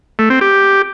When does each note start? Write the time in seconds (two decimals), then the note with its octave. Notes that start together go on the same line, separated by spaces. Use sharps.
0.19 A3
0.30 C4
0.41 G4